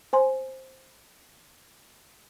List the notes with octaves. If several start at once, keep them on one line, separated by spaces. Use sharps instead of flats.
C5 G#5 C6